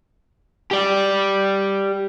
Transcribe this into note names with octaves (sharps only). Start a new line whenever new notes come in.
G4 D5